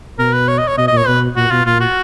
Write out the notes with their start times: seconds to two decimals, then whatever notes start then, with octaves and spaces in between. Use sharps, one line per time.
0.18 B2 A#4
0.33 B4
0.48 C#5
0.58 D#5
0.68 C#5
0.77 B2 D#5
0.88 D#5
0.92 A#2
0.97 C#5
1.07 B2 B4
1.36 A#2 F#4
1.51 B2 F4
1.65 A#2 F4
1.80 F#4